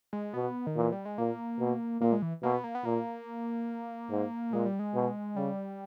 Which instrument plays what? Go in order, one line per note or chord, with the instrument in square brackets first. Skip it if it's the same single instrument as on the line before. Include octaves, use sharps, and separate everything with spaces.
[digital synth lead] G#3
[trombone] B2 [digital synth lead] B3
[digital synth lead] D#3
[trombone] A#2 [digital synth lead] E3
[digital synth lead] G3
G#3
[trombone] A#2 [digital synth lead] A#3
[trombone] B2
[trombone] A#2 [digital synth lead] A#3
[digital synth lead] G#3
E3
[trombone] B2 [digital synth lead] A#3
[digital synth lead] B3
A#3
B3
[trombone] A#2 [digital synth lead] A#3
[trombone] G#2
[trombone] A#2 [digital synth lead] G#3
[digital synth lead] G3
G#3
[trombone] B2
[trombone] C#3 [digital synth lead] G3